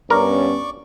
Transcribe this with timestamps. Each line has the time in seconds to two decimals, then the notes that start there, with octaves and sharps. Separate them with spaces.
0.10 G2 B3 C#4 A#4 D5 C#6 D6